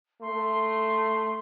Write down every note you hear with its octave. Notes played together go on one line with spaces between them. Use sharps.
A3 C6